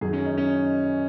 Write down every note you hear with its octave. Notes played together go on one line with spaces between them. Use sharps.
F#2 D#3 F#3 G#4
C#4
D#4
C#4
D#4